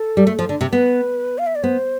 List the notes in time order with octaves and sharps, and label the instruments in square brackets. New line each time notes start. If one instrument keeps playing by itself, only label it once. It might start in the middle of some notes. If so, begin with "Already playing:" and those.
Already playing: [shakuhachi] A4
[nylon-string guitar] G3
A3
F3
D3
C3
[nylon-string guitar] B3 [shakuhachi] B4
[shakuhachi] F5
E5
D5
[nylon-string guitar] B3 [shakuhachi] C5